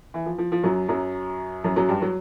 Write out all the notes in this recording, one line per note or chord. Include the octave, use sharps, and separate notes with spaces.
E3
F3
F3
F3
F#2 F#3
F#2 F#3
F#2 F#3
F#2 F#3
G2 G3
F#3